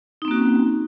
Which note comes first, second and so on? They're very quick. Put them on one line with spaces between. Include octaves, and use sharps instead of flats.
D#4 C4 A#3 F#4 C#4